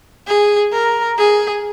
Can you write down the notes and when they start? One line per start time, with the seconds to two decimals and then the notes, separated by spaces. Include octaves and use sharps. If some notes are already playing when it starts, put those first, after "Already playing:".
0.27 G#4
0.73 A#4
1.18 G#4